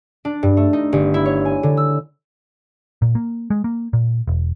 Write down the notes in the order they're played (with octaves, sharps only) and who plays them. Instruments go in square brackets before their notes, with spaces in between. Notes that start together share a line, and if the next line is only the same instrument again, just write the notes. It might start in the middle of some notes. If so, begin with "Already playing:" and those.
[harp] D4
G2
A3
D#4
G1
E4
C#5
G#5
D3
E6
[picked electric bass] A#2
A#3
G#3
A#3
A#2
E1